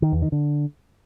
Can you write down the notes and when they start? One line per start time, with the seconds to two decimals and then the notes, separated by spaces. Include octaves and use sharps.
0.02 D#3
0.12 E2
0.22 D#3
0.32 D3